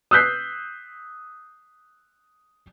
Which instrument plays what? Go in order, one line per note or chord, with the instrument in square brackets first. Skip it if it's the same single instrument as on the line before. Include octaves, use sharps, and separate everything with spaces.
[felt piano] D#6 E6 F#6 G6 B6 C7